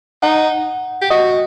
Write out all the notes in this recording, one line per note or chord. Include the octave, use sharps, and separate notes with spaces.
D#4 F#5
G4
F#4 D#5